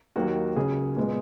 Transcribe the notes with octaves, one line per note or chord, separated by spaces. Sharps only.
D#2 D#3 F#3 A#3 F#4
C#2 C#3 F#3 G#4
A#2 G#3 B3